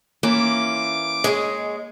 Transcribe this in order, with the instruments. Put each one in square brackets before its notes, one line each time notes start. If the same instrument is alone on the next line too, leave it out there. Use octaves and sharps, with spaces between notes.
[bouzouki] E3 E4 F4 [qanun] A#3 [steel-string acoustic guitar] C#4 [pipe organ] D6
[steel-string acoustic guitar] G#3 [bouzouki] G#4 C#5 D#5